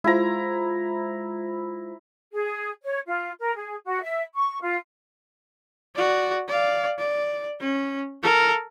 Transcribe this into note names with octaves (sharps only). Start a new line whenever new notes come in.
G#3 E4 F4 C5 A#5
G#4
C#5
F4
A#4
G#4
F#4
E5
C#6
F4
F#4 D5
D5 F5
D5
C#4
A4 A#4